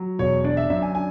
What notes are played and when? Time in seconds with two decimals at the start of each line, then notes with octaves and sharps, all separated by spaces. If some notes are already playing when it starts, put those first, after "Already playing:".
Already playing: F#3
0.19 E1 C#5
0.44 D4 D5
0.57 E5
0.70 F#2 E5
0.82 G#5
0.95 D4 G#5